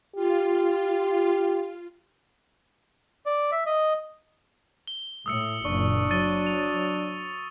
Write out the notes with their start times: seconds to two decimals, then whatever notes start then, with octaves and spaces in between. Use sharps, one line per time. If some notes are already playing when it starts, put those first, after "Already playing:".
0.16 F4 G4
3.26 D5
3.52 E5
3.66 D#5
4.87 G7
5.26 A2 D#6 E6 C#7
5.65 F#1 A#2 D4 C#6
6.11 F#3 A6 D#7 G7
6.46 F7